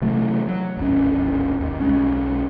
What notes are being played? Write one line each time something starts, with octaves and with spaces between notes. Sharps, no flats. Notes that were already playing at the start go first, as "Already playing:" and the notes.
C3 E3 F#3 A3
F#3
D1 G#1 C#4
D#2
B1 G#3 C#4